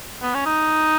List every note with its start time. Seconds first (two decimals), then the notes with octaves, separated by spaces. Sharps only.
0.22 B3
0.34 C#4
0.46 D#4